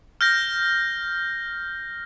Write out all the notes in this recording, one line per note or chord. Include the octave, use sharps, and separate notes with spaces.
F6 G6 A#6